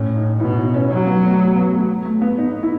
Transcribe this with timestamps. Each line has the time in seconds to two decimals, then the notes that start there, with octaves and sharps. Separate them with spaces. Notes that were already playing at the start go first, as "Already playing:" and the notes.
Already playing: A2 C#4
0.16 D#4
0.40 B2 E4
0.58 D#4
0.74 C#4
0.90 F#3
1.07 B3
1.24 A3
1.39 A3
1.56 B3
1.73 A3
2.05 A3
2.22 B3
2.38 D#4
2.63 E4